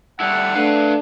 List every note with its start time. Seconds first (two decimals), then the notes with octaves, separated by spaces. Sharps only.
0.20 G3 A3 E4 F#5
0.55 A3 D4 B4 F5